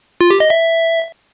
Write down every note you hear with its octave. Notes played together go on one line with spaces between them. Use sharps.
F4
G4
D#5
E5